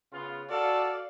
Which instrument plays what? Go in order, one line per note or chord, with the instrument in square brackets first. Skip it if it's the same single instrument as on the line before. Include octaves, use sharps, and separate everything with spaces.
[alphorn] C#3 [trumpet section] B3 F4
[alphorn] F#4 [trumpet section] A4 [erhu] D5 [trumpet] F5